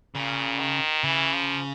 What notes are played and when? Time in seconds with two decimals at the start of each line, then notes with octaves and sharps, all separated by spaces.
0.15 A#2 C#3
0.60 D#3
1.04 C#3 E3
1.34 F3